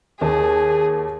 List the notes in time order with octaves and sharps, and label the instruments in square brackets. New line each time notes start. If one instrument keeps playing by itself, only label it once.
[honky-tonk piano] D#2 A5 [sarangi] G#4